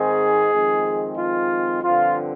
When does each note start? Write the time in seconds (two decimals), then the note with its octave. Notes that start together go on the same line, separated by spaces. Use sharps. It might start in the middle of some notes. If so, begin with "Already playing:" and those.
Already playing: G#2 D#3 G#3 C4 G#4
0.52 F2 D#3 G#3 C4
1.18 F4
1.83 G2 D3 F3 C4 F4